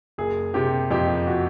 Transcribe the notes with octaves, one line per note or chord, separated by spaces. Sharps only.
F#1 G#4
C3 G4
F2 G4
F#4